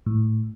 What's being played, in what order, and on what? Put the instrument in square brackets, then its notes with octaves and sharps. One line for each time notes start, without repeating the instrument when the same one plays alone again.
[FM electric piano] A2